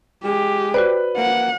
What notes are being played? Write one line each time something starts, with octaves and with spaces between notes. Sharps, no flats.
G#3 G4
F#4 B4 C5 D5
A#3 F#5